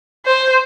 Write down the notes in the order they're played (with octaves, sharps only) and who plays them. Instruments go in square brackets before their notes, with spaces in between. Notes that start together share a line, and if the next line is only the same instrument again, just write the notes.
[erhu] C5